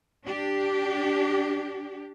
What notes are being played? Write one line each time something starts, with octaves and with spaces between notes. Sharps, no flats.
D4 G4